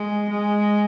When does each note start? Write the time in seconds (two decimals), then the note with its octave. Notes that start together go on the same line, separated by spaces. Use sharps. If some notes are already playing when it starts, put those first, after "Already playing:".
Already playing: G#3
0.31 G#3